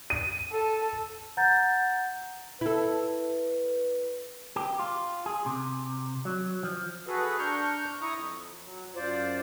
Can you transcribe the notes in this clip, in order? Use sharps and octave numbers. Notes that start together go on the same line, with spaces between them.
D#7
A4
F#5 A#5 G6 A6
E4 A4 B4
G4
F4
G#4
C3
F#3
F3
F#4 G#4 A4 B4
D4 A#5 C#6 F6 G6
E4 A#5 C#6 D#6
F2
F#3
F#2 F4 C5 D5